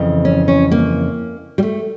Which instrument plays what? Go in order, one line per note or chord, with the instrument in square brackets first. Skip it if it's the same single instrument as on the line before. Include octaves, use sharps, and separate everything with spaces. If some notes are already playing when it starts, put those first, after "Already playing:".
Already playing: [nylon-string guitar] F2 C#3 E3
C#4
C#4
A#3
G3
A3